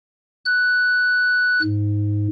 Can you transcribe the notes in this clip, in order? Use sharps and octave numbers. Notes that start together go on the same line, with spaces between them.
F#6
G#2